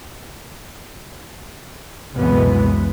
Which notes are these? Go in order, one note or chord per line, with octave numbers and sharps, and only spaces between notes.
C#2 F#2 B2 E3 G#3 B3